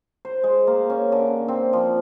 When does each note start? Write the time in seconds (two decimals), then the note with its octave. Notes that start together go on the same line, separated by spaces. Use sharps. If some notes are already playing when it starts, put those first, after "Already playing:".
0.25 C5
0.44 G#3
0.67 A#3
0.90 C#4
1.12 D3
1.48 C4
1.73 F3